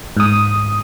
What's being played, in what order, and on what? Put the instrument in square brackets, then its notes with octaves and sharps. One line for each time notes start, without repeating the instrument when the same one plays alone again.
[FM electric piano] G#2 D#6